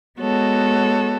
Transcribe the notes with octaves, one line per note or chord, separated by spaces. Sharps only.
G#3 B3 F#4 A4 C#5